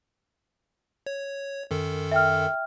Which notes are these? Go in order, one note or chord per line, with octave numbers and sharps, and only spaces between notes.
C#5
F#2 D#3 A4
E5 G5 F6